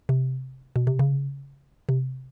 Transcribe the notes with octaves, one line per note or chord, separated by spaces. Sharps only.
C3
B2
C3
C#3
C3